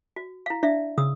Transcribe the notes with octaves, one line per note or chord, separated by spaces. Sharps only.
F#4
E4 F5
D4 D5 E5 F5
C#3 D#6 E6